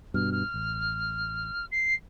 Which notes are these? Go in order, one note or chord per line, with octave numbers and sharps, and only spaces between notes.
G2 B2 F6
F6
A1
C7